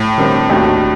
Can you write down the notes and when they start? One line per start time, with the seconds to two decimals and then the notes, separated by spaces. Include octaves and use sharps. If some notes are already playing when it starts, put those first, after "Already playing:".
Already playing: A2
0.18 D3 G3 C4 G4 A#4
0.49 D#2 D#3 A3 D4 F#4